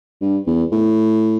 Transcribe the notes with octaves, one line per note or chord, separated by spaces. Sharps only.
G2
E2
A2